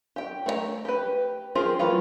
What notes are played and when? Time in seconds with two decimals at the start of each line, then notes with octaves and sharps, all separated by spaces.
0.16 G4 G5
0.46 A3 C5 A#5
0.85 G4 B4
1.55 F4 G4 G#4 A#4 C5
1.79 E3 F#3 A3 F4